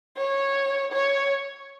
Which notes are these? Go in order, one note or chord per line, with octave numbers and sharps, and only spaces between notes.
C#5
C#5